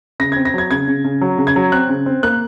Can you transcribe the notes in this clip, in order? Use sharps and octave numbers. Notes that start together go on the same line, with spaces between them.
C#3 A#6
C4 G#6
A#6
F#3 G#6
C#3 G#6
C#3
C#3
F#3
C#3
G#6
F#3
C4 F#6
C#3
C4
A#3 F#6